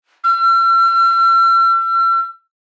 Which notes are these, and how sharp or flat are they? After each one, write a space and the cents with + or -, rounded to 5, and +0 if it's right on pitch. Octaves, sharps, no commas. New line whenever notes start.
E6 +45